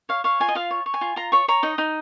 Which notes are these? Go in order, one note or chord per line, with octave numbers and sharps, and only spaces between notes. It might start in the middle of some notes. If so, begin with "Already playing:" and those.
C#5 F5
C#5 F5
F4 G#5
D#5
F4 F5
C#5
C#5
G#5
F4
F4 A#5
C#5 C#6
C#5 A#5
D#4 D#5
D#4